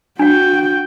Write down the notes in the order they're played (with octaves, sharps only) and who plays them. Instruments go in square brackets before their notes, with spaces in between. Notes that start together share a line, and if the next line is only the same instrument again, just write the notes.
[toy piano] D4 F5 [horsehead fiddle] F#4 G5